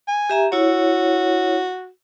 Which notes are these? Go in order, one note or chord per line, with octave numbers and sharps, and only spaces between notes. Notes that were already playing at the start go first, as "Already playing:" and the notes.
G#5
G4 E5 A#5
E4 F#4 C#5